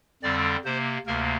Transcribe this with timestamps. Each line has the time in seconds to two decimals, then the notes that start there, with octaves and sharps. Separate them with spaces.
0.23 F2 D3 G3 C4 D5
0.65 C3 A#3 C5
1.07 D2 C3 A#3 A#4